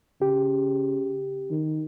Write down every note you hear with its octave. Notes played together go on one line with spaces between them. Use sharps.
C#3 G4
D#3